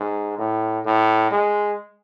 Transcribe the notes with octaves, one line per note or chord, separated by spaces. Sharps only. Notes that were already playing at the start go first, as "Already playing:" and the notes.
Already playing: G#2
A2
A2
G#3